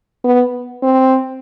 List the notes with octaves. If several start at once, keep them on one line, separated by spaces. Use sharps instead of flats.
B3
C4